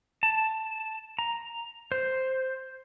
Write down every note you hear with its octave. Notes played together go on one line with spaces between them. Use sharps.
A5
A#5
C5